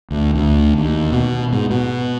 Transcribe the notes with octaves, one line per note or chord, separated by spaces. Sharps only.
D2
D2
D#2
B2
G#2
B2